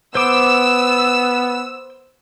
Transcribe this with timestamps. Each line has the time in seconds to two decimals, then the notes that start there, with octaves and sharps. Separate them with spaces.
0.15 B3 C5 D6 E6